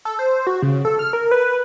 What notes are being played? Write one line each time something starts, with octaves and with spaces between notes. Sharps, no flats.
A4
C5
F#4
C#3
A4
F6
A#4
B4